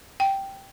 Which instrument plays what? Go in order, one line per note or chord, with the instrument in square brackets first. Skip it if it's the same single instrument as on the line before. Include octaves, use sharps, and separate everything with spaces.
[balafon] G5